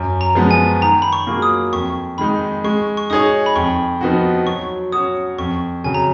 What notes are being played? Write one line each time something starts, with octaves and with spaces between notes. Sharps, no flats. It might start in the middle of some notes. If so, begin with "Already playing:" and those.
Already playing: F#2
A#5
F3 G#3 B3
G#5
D#3 A#5
B5
C#6
F#3 A#3 F4 G#4
D#6
F2 C#6
D#3 G#3 D#4 B5
G#3 C#6
C#6
D#4 G#4 C#5 D#6
B5
F2 C#6
F3 B3 D#4 F#4
F#3 C#6
C#4 F#4 C#5 D#6
F2 C#6
C#3 F#3 G#5
A#5